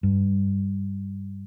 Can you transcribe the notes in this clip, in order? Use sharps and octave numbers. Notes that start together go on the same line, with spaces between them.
G2